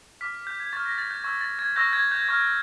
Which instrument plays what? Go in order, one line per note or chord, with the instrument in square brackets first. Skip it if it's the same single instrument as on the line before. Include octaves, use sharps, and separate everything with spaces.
[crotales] D6 F6 B6
G6
G#6
C#6 F6 A6
A#6
A6
G6
C#6 E6 G6 G#6
A6
G#6
C#6 E6 G6 A#6
G#6
G6
C#6 F6 G#6